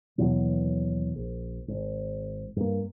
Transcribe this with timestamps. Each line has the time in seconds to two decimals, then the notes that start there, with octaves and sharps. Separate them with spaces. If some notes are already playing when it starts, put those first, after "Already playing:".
0.18 D#2 B2 E3 F#3
1.16 A#1
1.68 G#1
2.56 G2 A#3